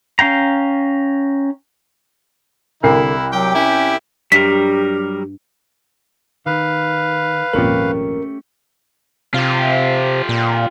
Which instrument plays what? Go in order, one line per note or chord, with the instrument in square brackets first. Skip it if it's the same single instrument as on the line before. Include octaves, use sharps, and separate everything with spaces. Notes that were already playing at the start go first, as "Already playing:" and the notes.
[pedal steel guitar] C#4 F5 G5 A#5
[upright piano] C2 A#4 C7 [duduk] D3 [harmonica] E4
[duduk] F#3 [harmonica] G4 [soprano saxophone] G5
[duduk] C#4 [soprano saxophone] E4
[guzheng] G2 [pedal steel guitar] F#3 G3 A#4 [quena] G4 [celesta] B6
[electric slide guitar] D#3 [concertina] B4 F5
[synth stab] G#1 F2 A#2 [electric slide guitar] A3 C#4 G4 [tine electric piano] A#4
[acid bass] C3 [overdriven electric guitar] F4 G4
[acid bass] A#2